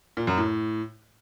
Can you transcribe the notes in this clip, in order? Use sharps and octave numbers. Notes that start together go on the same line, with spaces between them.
A#2
F#2
A2